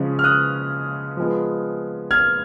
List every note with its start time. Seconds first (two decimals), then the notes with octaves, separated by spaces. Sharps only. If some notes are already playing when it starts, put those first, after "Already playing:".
Already playing: C#3 F3 G#3 C#4
0.19 F6
0.24 D#6 F#6
1.17 F3 G#3 B3
2.11 F6 G#6